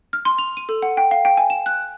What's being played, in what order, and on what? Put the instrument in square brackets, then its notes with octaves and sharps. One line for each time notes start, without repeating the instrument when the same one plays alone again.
[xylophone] F6
C6
F7
D#7
A4
F#5
G5
F5
G5
G#5
E7
F#6